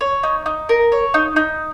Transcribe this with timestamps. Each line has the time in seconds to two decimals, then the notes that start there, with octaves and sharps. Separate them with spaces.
0.01 C#5
0.23 D#4
0.46 D#4
0.69 A#4
0.92 C#5
1.14 D#4
1.36 D#4